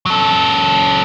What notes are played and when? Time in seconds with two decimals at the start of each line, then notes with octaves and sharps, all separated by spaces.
0.06 F#3 A4